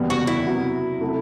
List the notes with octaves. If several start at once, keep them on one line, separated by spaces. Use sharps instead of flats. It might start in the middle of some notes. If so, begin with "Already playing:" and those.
Already playing: F#1 E2 B2 G3 B3
F#4
E4
C3 F#3 B3 F#4
C3 F#3 A3